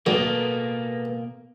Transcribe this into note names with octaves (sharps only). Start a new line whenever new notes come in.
B2 D3 F#3 A#3 B3 A4 B4 D#5